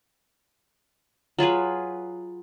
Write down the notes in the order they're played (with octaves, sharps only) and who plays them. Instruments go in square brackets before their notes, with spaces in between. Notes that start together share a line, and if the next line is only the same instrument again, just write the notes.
[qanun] F#3 F4 G#4 B4